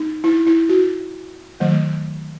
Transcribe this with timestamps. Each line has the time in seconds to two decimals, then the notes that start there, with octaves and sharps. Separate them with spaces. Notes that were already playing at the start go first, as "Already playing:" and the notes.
Already playing: D#4
0.24 E4
0.46 E4
0.69 F#4
1.60 D#3 F#3 A3